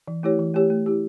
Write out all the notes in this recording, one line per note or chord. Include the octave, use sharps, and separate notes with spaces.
E3
A3 E4 G4 C#5
E3
A3 E4 G4 C#5
A3
E4 G4